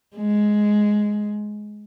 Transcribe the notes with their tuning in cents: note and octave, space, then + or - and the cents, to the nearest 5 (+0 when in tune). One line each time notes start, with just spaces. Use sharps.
G#3 +5